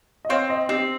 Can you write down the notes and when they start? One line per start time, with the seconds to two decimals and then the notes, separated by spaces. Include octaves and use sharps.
0.25 D#5
0.29 C4 C#5 F5
0.49 C5 D#5
0.69 C4 D#4 G4